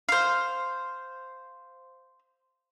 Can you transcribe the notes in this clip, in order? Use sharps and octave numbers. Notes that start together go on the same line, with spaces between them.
C5 F5